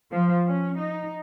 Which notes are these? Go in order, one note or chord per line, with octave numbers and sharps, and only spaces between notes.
F3
C#4
D#4